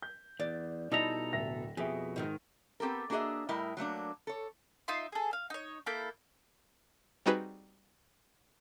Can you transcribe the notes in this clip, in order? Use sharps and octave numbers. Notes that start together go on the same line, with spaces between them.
G6
E2 D5
B2 G3 D#4 E4 A4 A#5
D1 E5 A#6
F2 B2 G4 G#4 E5
G#2 D#3 D#4
B3 C4 G4 A4 A#4
A#3 D4 F#4 G#4 D#5 E5
A2 G3 E4 A#4 D#5
F#3 A3 A#3 D4
A4 C#5
D#4 F4 E5 C6
G#4 A4
F5
D#4 C#5
A#3 E4 A4 G6
G3 C4 D#4 F#4 G#4 B4